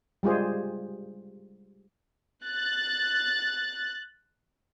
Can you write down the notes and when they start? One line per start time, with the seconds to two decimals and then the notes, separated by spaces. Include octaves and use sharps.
0.23 G3 G#3 F4 G#4 C5
2.45 F#6 A6